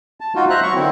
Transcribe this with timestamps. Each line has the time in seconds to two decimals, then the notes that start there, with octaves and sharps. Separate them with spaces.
0.20 A5
0.35 D#4 F4 F#4
0.50 C5 E5 A#5 F#6
0.63 F#3 C#6
0.75 D3 D#3 C4 E4